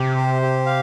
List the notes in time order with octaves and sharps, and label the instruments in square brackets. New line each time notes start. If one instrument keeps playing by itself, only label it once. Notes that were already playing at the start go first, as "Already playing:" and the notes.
Already playing: [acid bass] C3 [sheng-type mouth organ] G4
[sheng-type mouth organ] C5
G4
F5